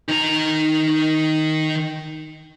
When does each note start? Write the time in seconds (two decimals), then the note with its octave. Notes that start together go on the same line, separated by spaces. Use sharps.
0.09 D#3 A#5